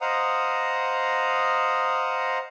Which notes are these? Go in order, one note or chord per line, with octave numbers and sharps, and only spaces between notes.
C5 D#5 F5 F#5 A#5 D#6